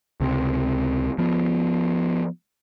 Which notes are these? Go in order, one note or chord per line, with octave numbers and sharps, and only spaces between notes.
C#2 C3 C4
F3 B3